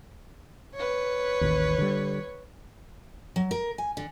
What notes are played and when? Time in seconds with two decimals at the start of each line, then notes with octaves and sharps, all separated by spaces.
0.76 B4 C#5
1.41 A1 D#2
1.78 D3 G3
3.36 F#3
3.51 A#4
3.78 G#5
3.97 D3